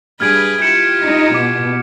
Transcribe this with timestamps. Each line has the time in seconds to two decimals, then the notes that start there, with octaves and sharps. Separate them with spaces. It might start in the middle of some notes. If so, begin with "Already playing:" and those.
0.20 G2 G#4 B4 F6 G#6 D7
0.62 E4 F4 G4 G6 C#7 E7
1.03 D#4
1.34 B2 D6